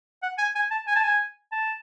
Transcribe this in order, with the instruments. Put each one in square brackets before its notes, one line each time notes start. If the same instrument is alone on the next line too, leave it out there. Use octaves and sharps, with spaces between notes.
[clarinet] F#5
G#5
G#5
A5
G#5
A5
G#5
A5